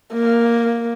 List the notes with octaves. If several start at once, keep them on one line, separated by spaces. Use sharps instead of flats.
A#3